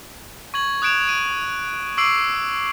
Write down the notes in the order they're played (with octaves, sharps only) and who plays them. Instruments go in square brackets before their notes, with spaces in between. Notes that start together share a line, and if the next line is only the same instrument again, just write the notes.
[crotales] C#6 G#6 F#7
D#6 F#6 G#6 D7 E7 F7
D7 D#7
C#6 D6 E6 C7 D7 F#7